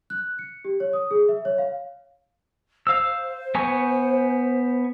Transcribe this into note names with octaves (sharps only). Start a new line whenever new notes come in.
F#6
C#7
G4
C#5
D#6
G#4
E5
C#5
F5
C5 F5 E6
B3 G#5 C#6